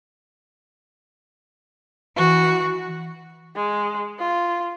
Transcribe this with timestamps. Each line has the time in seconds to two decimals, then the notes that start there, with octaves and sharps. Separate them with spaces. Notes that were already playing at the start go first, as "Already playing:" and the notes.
2.15 E3 F#4
3.56 G#3
4.19 F4